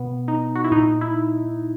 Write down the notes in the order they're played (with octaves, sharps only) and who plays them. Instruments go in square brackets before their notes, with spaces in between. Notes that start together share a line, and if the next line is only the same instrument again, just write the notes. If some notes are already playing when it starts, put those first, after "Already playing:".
Already playing: [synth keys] B2 B3
D#4
F#4
E4
A#2 D#4
E4